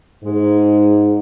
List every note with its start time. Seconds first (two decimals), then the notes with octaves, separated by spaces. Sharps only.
0.24 G#2 G#3